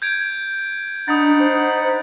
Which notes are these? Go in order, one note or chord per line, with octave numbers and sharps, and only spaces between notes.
G6 G#6 D7
D4 D#4 F#5 B5 D#6 A6
C5